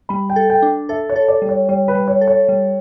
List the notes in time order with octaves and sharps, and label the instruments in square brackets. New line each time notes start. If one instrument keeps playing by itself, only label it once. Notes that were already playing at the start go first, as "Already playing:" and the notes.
[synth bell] G3 [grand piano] B5
[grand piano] G5
[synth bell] A4
[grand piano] G5
[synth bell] D4
[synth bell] A4 [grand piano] E5
[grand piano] C#5
[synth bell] A4
[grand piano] D5
[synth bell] G3
[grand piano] C#5
[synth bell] G3 [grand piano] C#5
[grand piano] B4
[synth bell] G3
[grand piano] C#5
[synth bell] A4
[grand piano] C#5
[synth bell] G3